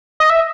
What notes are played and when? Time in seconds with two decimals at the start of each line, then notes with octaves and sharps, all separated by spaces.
0.20 D#5
0.30 E5